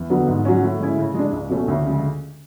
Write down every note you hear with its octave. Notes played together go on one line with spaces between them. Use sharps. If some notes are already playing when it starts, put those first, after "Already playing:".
Already playing: E2
D3 F#3 B3
G#2
F#3 C#4
A2
G#3 C#4 E4
C#3
G#3 D4
C#2
B2 A3 C#4
D2
C#3 G#3